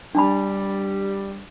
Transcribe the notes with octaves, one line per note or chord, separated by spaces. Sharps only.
G3 D4 A5 B5